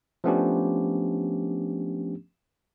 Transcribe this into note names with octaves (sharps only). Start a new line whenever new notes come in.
F3 A3 B3 C#4 D4 G4